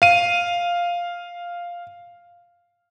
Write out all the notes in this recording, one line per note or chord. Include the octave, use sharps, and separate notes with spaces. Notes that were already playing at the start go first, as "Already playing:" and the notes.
F5 D#7